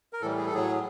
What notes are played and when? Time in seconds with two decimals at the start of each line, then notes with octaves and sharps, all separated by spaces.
0.13 A#4
0.22 A2 E3 G3 A4
0.38 G#4
0.46 A4
0.53 A2 F#3 G#4